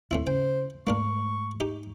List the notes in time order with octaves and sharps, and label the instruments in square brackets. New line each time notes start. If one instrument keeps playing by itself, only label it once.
[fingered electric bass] D#2 [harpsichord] A2 C4 E4
[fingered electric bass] C#3 [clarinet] C5 [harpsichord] G5
[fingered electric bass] G#2 A3 [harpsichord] A#3 D4 A#4 [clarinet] C#6
[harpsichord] D#4 G4